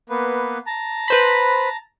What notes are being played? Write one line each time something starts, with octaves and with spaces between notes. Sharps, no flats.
A#3 B3 B4
A5 A#5
B4 C5 B5